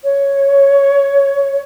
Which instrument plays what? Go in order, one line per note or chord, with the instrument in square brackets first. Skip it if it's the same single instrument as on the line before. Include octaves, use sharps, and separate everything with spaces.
[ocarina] C#5